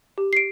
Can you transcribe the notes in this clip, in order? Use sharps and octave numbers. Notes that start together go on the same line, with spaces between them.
G4
C7
D7